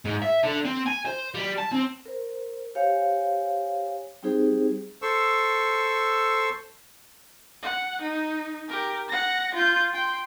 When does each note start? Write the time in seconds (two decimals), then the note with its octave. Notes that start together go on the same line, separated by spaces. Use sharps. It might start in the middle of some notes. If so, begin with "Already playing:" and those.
0.05 G#2
0.22 E5
0.43 D3
0.65 C4
0.86 G#5
1.05 C5
1.34 G3
1.58 A5
1.72 C4
2.06 A#4 C5
2.75 G4 C5 C#5 F5 G#5
4.23 G3 C4 D#4 G4 G#4 C5
5.02 A4 C5 C#6 E6
7.63 F#5
8.02 D#4
8.68 G4 A#4
9.09 F#5 A#6
9.55 F4 G6
9.93 G5 C6